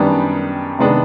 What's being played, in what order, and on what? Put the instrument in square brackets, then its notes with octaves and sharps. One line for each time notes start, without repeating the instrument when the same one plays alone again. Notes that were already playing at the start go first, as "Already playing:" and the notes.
Already playing: [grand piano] F#2 D#3 G3 B3 D4
C3 D#3 G#3 B3 D4